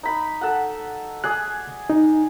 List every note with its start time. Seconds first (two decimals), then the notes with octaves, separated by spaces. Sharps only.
0.03 D#4 B5
0.41 A4 F#5
1.24 G#4 D5 F#6
1.90 D#4